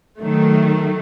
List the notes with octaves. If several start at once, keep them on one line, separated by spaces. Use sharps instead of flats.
D#3 F#3 A3